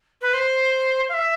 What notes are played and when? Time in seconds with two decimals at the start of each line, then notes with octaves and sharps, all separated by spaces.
0.21 B4
0.33 C5
1.09 F5
1.13 E5